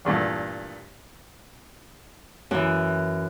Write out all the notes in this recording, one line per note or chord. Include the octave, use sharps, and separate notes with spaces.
E2 G2 A#2 A3
F#2 E3